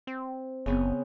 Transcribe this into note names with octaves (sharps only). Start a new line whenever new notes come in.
C4
F#1 C#3 B3 C4